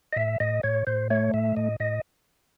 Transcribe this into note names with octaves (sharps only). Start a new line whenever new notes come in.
D#5
A2 E5
A2 D#5
A2 C#5
A2 C5
A3 C#5
A2 E5
A2 D#5
A2 D#5